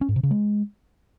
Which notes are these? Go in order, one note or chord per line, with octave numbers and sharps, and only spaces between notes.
C#4
G#2
C3
C#3
G#3